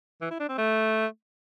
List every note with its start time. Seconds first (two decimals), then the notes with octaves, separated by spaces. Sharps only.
0.22 E3
0.31 E4
0.40 D4
0.49 C4
0.58 A3